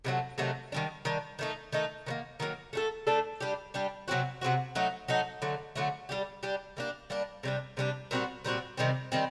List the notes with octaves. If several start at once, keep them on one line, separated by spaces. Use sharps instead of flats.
C3 D#3 F#3 A3
C3 D#3 F#3 A3
D#3 G3 D4
D#3 G3 D4
D#3 A3 D#4
D#3 A3 D#4
D#3 F#3 A#3
D#3 F#3 A#3
A3 D4 A4
A3 D4 A4
G3 D4 G4
G3 D4 G4
C3 F#3 C4 F#4
C3 F#3 C4 F#4
F#3 A3 D#4
F#3 A3 D#4
D3 F#3 A3
D3 F#3 A3
G3 D4 G4
G3 D4 G4
G3 A#3 D4
G3 A#3 D4
C3 G3 D4
C3 G3 D4
A#2 G3 C4 F#4
A#2 G3 C4 F#4
C3 D#3 G3 C4
D#3 G3 C4